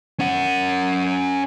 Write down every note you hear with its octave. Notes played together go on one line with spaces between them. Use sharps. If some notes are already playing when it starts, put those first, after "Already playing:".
C#4 F#5